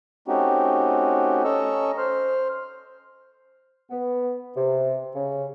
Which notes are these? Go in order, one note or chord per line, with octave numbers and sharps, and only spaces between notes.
A3 C4 C#4 D#4 F#4 G4
C#4 A4 D#5 A#5 C#6 E6
C5 C6 F6
B3
C3
C#3